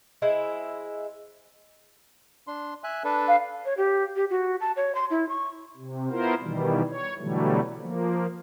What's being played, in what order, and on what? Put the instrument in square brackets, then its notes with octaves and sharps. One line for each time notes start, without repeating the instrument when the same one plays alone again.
[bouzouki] G#3 E4 C5
[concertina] D4 C6
E5 G#5 F#6
D4 A4 B4
[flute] F5
[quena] C#5
G4
G4
F#4
A5
C#5
C6
E4
C#6
[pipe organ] C3
B3 E4 F4 A#4 C5
B2 D#3 E3 G3
C#5
B2 D3 E3 F#3 G3 A3
F3 A#3